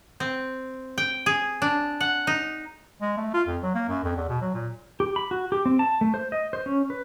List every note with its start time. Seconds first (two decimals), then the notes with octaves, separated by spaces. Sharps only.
0.20 C4
0.98 G5
1.26 G#4
1.62 D4
2.00 F#5
2.27 D#4
3.01 G#3
3.17 A3
3.34 F4
3.47 F2
3.63 F#3
3.75 A#3
3.89 F#2
4.04 F2
4.17 E2
4.29 B2
4.41 F#3
4.54 A#2
5.00 G4
5.16 B5
5.31 F#4
5.52 G4
5.66 C4
5.79 A5
6.01 A3
6.14 C5
6.32 D#5
6.53 C5
6.66 C#4
6.90 B4